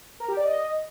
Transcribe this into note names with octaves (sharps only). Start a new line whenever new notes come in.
A#4
G4
D5
D#5